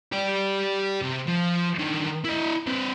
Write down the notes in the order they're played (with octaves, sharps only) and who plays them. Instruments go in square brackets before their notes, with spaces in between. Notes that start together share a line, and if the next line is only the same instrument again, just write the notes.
[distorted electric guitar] G4 D5
C3
F3
D3 D#3
E4 D#5
C4 B4